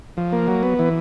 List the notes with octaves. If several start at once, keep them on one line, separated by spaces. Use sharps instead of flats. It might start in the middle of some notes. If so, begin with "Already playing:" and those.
F3
A#3
F#3
B3
E3